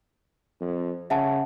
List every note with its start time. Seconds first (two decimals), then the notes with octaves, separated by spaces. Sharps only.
0.61 F2
1.10 C#3 E5 F#5 A5